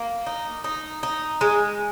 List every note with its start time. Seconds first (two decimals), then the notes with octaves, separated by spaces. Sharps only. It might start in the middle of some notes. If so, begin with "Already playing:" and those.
Already playing: A#3
0.26 D#4
0.64 D#4
1.03 D#4
1.41 G#3